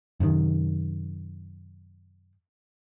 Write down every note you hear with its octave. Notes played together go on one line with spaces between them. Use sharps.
F#2 C3 D#3